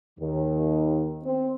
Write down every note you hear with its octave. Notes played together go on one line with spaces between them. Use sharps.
D#2 D#3
C4